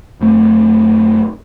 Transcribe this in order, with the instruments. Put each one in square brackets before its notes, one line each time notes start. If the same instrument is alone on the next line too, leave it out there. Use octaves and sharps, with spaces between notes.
[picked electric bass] F#2 A3 C4